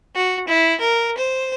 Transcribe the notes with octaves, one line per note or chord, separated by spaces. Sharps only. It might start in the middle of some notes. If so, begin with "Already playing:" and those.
F#4
E4
A#4
C5